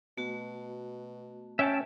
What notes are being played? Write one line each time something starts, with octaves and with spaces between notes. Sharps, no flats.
B2 A3 F#4
C#4 E5 G5 A5